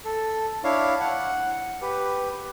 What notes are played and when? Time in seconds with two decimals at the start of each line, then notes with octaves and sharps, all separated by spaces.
0.05 A4
0.64 D4 E4 C#5 F5
1.00 F#5
1.82 G4 B4